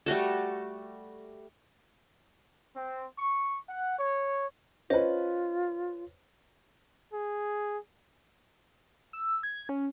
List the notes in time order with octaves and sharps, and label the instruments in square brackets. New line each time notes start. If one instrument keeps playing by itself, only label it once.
[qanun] G3 A3 F#4 A4
[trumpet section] C4
C#6
F#5
C#5
[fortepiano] C#4 B4 [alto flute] F4 [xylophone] C5 D#5
[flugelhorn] G#4
[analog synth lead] E6
G#6
C#4